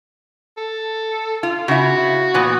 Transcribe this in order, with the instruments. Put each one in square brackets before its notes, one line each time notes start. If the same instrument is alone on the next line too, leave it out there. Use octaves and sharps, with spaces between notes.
[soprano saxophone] A4
[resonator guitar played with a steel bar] F4
[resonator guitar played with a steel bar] C#3 E4 [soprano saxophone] F#4
[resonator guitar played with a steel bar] A#2 E3 B3